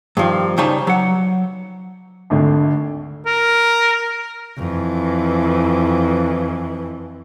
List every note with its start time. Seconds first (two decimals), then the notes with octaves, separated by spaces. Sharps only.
0.17 G2 D#3 F3
0.58 C#3 G3 D#4 C5 C#5 A5
0.87 F#3 F#5
2.30 G#1 D2 D3
3.26 A#4
4.58 F2 E3